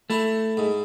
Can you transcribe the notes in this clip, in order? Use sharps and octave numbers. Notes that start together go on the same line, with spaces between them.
A3 E4
G#2